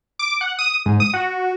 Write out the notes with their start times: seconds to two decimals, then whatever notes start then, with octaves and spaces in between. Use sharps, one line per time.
0.19 D6
0.41 F#5
0.59 D#6
0.86 G#2
1.00 D#6
1.14 F#4